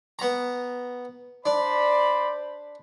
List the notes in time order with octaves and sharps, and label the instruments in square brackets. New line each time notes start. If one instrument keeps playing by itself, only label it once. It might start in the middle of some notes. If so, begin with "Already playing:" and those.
[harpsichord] B3 A#5
[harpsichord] D4 [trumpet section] C5 D5 B5